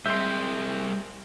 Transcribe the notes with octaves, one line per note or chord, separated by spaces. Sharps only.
C2 G3 C4 G#4 D#5 E5 C6 G6